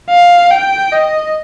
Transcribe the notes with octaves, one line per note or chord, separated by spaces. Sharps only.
F5
G5
D#5